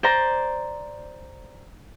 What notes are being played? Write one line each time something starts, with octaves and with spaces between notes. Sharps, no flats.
C5 D5 A#5